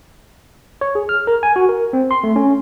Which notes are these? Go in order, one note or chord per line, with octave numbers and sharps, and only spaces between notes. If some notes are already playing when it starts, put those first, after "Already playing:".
C#5
G#4
F6
A#4
G#5
F#4
A#4
C4
C6
A3
C#4